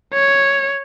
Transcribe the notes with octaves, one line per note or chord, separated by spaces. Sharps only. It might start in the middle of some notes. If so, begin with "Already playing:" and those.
C#5